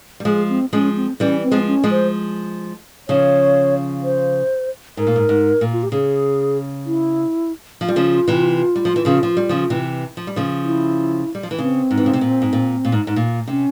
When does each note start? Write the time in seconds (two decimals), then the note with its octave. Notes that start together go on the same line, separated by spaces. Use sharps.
0.20 G3
0.25 F3 G#3 G#4
0.49 C4
0.73 F3 G#3 C#4
0.96 C4
1.20 E3 G3 C#4
1.43 C4
1.51 F3 G#3
1.67 C#4
1.83 F3 G#3
1.91 C5
3.08 C#3 F3 C#5
4.04 C5
4.97 G#2 A#4
5.07 A#2
5.16 G#2
5.29 G#2
5.61 A#2
5.73 F4
5.83 G4
5.92 C#3 G#4
6.86 E4
7.81 F3 F4
7.88 G3
7.96 C#3 F3
8.28 C3 E3
8.76 G3
8.85 F3
8.96 E3
9.05 C#3 F3
9.23 F3
9.37 G3
9.49 C#3 F3
9.70 C3 E3
10.17 F3
10.27 G3
10.36 C#3 F3
10.64 E4
11.35 G3
11.43 F3
11.51 E3
11.58 C#3 C4
11.91 G#2
11.97 E3
12.06 C#3
12.13 C3
12.21 A#2
12.42 G#2
12.53 A#2
12.85 A#2
12.92 G#2
13.07 G#2
13.16 A#2
13.47 C3 C#4